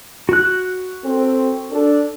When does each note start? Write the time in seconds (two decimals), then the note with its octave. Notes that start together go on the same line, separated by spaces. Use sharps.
0.29 F#4 F#6
1.05 C4 A4
1.71 D4 A4